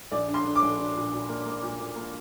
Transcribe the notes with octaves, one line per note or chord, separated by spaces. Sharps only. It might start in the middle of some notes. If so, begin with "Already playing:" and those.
A#1 D5
D4
C6
D4
D6
A#1
D4
A#2
A#2
A#3
A#3
A#2
A#2
A#3